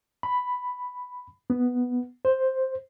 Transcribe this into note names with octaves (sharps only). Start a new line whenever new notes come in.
B5
B3
C5